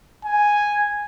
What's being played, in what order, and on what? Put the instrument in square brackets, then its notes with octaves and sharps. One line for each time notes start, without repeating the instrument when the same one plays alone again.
[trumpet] G#5